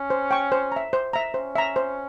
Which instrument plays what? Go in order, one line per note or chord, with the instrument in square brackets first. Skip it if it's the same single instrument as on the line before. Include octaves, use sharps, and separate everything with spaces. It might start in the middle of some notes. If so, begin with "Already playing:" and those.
Already playing: [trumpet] C#4
[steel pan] C5
G5 C#6
C5
E5 A#5
C5
E5 A#5
[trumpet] C#4 [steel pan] C5
[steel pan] E5 A#5
C5